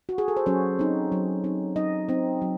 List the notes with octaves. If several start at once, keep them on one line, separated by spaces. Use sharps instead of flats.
F#4
G#4
A4
C5
F#3 C#4 C#5
C4 D#4
F#3
C4 D#4
F#3 D#4 D#5
C4 D#4
F#3